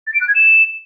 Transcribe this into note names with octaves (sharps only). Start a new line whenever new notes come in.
A6
D7
F#6
G#6
E7